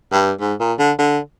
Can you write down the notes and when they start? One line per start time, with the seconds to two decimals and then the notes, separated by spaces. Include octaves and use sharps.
0.12 G2
0.41 G#2
0.60 A#2
0.79 D3
0.98 D3